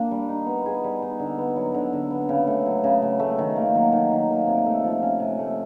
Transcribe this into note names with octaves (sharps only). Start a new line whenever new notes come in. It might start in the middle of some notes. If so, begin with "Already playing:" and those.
Already playing: A#3 D4
G3
D#4
B3
G#4
G3
D#4
D3
B3
F#3
D3
D3
B3
C#3
A3
F#3
C#3
C#3
A3
D#3
A#3
F#3
D#3
D#3
A#3
C3
A3
F3
C#4
C3
A3